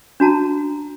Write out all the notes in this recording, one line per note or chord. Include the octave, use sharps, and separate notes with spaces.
D4 F#4 A5 A#5